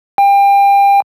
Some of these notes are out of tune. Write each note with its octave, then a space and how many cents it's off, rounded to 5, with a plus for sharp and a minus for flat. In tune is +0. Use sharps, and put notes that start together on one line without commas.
G5 +30